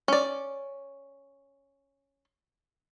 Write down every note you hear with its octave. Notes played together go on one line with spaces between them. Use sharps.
C#4 D5